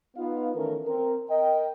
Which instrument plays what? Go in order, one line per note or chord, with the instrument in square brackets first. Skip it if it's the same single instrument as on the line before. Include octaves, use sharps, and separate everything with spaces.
[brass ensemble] B3 D#4 F4 F5
D#3 E3 A3 C#4 A4 A#4
C4 A#4
A#4 D#5 G5